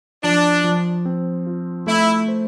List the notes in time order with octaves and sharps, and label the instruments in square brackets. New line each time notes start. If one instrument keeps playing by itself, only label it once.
[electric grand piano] F3 [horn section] D4
[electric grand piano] F3
C4
F4
[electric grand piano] A3 [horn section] E4
[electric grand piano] C5